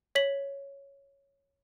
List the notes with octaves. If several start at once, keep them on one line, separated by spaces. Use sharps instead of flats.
C#5 B6 F#7